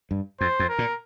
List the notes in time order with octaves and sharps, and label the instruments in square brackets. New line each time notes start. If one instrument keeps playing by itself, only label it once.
[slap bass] G2
[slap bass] F2 [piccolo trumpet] C5
[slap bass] F2
[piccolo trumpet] A#4
[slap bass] A#2